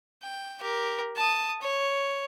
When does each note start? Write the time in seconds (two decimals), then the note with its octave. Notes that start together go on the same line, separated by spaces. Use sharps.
0.23 G5
0.61 G4 A#4
1.16 A5 D#6
1.61 C#5